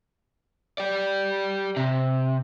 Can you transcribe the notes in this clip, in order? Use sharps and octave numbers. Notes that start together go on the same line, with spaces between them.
G4 D5
C3